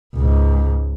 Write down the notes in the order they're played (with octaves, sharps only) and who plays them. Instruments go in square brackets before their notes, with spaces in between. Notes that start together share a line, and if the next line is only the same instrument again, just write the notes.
[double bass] C#2 G#2